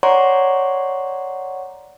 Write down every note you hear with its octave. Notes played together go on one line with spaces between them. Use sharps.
C#5 D5 F#5 A#5 C6 C#6